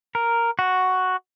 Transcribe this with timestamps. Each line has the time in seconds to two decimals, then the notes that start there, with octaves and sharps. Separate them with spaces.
0.15 A#4
0.59 F#4